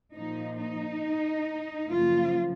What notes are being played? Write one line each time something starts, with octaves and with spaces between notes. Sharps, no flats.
A#2 F3 A#3 D#4
D#4
F#2 C#3 F3 A#3 F4